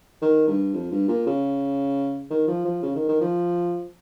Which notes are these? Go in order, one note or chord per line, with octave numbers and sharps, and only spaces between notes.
D#3
G2
F2
G2
A#2
C#3
D#3
F3
F3
C#3
D#3
D#3
F3